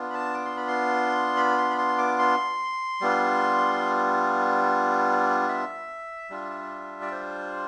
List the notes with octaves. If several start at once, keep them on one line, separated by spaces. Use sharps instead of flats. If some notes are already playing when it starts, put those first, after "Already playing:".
Already playing: B3 D4 F4
B5
A5
D6
C6
B5
C6
B5
C6
B5
C6
D6
C6
G3 B3 D4 F4
E5
G3 D4 F4
D5
C5